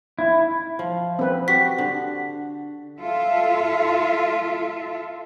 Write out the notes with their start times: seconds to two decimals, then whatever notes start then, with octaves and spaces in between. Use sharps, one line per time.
0.19 E4
0.79 F3
1.19 C4 B4
1.48 F#4 G4 B6
1.78 D3
2.99 F4 A4 E5